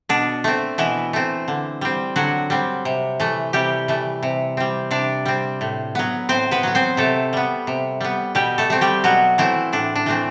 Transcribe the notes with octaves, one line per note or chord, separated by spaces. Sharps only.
B2 D4
A3 C4
B2 E3 E4
A3 C4
D3
G3 C4
D3 F#3 F#4
G3 C4
C3
E3 A3
C3 G3 G4
E3 A3
C3
G3 C4
C3 D4 D5
G3 C4
A2
F#3 B3
A2 C4 C5
B3 B4
F#3 B3
C4 C5
C3 A3 A4
G3 B3
C3
G3 B3
B2 G3 G4
A3 A4
A3 C4
G3 G4
B2 F#3 F#4
E3 A3 C4 E4
A2 D4
D4
E3 A3 C4